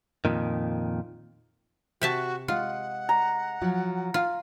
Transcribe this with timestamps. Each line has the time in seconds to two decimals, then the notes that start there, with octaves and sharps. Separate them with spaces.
0.25 F2 A#2 D#3
2.01 C3 F#4 E5 A5
2.48 G#3 F4 F#5
3.09 A#5
3.62 F3 F#3
4.14 F4